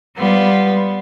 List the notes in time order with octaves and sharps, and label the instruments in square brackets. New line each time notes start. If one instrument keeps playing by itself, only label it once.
[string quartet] G3 B3 F4